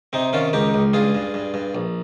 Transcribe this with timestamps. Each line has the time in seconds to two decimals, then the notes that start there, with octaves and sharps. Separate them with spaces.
0.13 C3 C4 D#4
0.33 D#3 C#4 F4
0.53 C#2 D#4 G4
0.74 C#2
0.93 G2 F4 G#4
1.15 G2
1.34 G2
1.54 G2
1.75 A#1